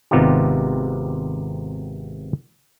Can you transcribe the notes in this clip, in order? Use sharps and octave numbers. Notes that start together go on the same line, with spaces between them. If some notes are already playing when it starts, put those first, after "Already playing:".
G#1 C3 B3 D#4 F4 G4